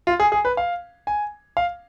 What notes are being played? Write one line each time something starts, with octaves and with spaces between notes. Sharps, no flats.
F4
G#4
G#4
B4
F5
G#5
F5